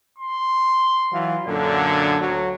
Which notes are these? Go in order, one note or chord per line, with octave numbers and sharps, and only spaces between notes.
C6
E3 F#3 F4
F#2 A#2 D3 G#6
D2 F#3